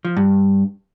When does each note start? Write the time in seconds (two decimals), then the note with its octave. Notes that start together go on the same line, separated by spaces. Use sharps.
0.05 F3
0.17 G2